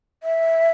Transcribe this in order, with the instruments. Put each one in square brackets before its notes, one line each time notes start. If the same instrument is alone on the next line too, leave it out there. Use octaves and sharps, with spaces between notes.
[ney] E5